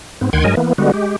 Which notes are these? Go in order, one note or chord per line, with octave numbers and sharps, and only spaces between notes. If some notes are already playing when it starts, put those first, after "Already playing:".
G#2 B3 C4
D2 D#3 F#5 G5 C6 G#6
G2 F#3 G#3 A#4 D#5 G#5
E3 A#3 B3
D3 G3 G#3 B3 F#4
G#3 G4